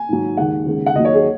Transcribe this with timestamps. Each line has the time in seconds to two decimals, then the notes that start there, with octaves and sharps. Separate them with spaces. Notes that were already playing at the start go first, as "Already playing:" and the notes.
Already playing: G#5
0.09 G#2 D#3 F#3
0.37 D#2 D#3 G#3 F#5
0.66 D#2 C#3 G#3
0.86 F#5
0.95 D#2 D#3 F#3 D#5
1.05 C#5
1.14 G#4